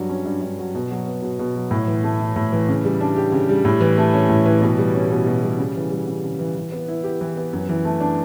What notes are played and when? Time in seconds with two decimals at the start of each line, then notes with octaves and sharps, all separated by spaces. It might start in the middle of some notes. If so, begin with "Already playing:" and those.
Already playing: G2 F#3
0.09 C#4
0.26 G2
0.42 G2
0.59 F#3
0.75 B2
0.91 F#3
1.07 B3
1.22 B2
1.39 B2
1.56 F#3
1.71 A2
1.87 E3
2.04 A3
2.20 E4
2.36 A2
2.52 E3
2.68 C#3
2.85 G3
3.01 D4
3.16 G4
3.32 C#3
3.49 G3
3.65 A2
3.81 E3
3.98 A3
4.13 C#4
4.29 A2
4.46 E3
4.62 B2
4.78 G3
4.94 C#4
5.11 B2
5.26 B2
5.43 G3
5.58 C#3
5.76 E3
5.92 G3
6.07 C#3
6.24 C#3
6.39 E3
6.56 E3
6.72 B3
6.88 E4
7.04 G4
7.21 E3
7.37 B3
7.53 F#2
7.69 E3
7.85 A3
8.00 D4